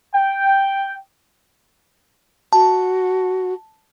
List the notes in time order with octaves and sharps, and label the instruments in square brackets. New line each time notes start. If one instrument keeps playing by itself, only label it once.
[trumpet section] G5
[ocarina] F#4 [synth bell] A5